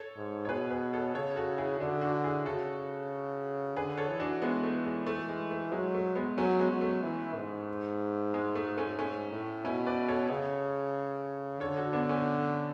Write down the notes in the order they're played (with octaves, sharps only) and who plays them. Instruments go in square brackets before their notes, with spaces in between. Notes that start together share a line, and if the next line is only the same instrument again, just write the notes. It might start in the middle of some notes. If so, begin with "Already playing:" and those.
Already playing: [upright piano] A4 C#5
[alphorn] G#2
[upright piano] C#5
[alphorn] B2 [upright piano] G#4 B4
[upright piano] G#4 B4
A4 C#5
[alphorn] C#3 [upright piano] A4 C#5
[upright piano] F#4 A4
E4 G#4
[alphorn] D3 [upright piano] D4 F#4
[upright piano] D4 F#4
E4 G#4
[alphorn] C#3 [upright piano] F#4 A4
[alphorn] D3 [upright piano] G#4 B4
[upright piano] A4 C#5
[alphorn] E3
[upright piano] D4 F#4
G#3 B3
A3
G#3
A3
G#3
A3
[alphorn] F#3 [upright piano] G#3
[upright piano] A3
G#3 B3
[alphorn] F#3 [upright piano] A3 C#4
[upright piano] G#3 B3
[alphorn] F#3
[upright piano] A3
[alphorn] E3
G#2
[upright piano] G#3
A3
A3 C#4
[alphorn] G#2 [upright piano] A3 C#4
[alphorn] A2
[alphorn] B2 [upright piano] C#4 E4
[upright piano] B4 D5
A4 C#5
[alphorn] C#3
[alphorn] D3 [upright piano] A4 C#5
[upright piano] F#4 A4
B3 D4
A3 C#4